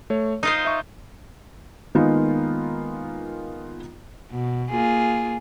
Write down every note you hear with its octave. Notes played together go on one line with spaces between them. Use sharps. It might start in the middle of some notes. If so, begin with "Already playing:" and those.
A3 C#5
D#4 F4 C5 D#6
E5 C#6
D#3 G#3 A#3 B3 D#4 F4
B2
A#3 F4 G#4